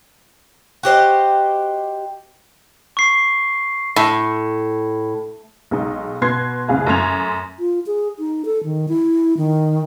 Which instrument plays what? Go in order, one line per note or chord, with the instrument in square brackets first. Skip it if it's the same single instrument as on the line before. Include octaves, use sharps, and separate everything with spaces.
[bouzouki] F#4 G4 C5 D#5
[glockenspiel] C#6 C7
[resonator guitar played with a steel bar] A2
[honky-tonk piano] B1 G#3 D#4
B2 B4 C6 G#6 C7
F#1 C2 C#3 G#3 F5 G#5
F#2 A3 C6 G#6 F7
[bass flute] F4
G#4
D#4
A4
D#3
E4
D#3